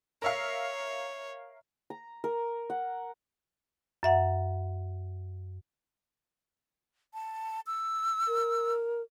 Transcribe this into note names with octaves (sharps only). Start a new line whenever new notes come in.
A#4 C#5 E5 F5
A#5
A#4
F#5
F#2 E5 F#5
A5
E6
A#4